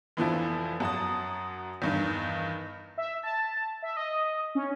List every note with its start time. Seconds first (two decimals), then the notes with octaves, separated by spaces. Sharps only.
0.17 F1 E3 F3 E4
0.80 F#2 F#4 A5 D#6
1.82 E2 G2 D#3
2.98 E5
3.23 A5
3.82 E5
3.97 D#5
4.55 C#4